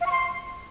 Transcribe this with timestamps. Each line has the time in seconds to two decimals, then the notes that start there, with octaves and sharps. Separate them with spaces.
0.01 F5
0.06 C#6
0.12 C6